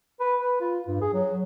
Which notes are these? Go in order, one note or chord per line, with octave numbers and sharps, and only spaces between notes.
B4
B4
F4
G2
G#4
F#3